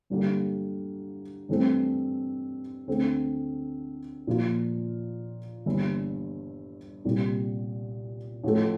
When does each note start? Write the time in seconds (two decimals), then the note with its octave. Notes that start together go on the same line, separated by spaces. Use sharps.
0.10 G2 D3 G3 A#3
1.49 G2 E3 A3 C4
2.87 D2 D3 A3 C4
4.27 A#2 F3 A#3 F4
5.66 G1 G2 E3 A#3 E4
7.05 C2 A#2 G3
8.44 A1 A2 F3 A3